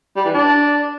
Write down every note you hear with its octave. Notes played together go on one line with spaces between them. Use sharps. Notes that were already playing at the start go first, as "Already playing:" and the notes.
G3
E3
D4